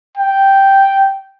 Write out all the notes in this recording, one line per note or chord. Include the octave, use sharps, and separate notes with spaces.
G5